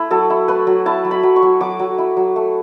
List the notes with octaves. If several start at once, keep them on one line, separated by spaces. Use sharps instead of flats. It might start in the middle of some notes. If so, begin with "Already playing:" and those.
Already playing: A3 E4
F#3 A4
E4
A3 B4
F#3
E4 A5
F#3
B5
F#3
C#6
F#3
F#3 D6
F#3
E4
F#3
A3